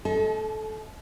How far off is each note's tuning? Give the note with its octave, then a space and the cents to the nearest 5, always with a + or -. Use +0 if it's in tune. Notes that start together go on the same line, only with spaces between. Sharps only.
A4 -20 D#5 +35 A5 -45